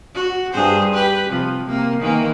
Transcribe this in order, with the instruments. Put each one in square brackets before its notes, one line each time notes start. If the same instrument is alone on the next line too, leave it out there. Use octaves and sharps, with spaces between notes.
[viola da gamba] F#4
G2 G#4 C5
G4 B4
C3 F3
C3 A#3
D#3 E3 A#3